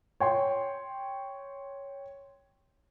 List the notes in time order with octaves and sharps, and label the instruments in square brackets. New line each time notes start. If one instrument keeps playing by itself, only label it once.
[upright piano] C#5 G5 C6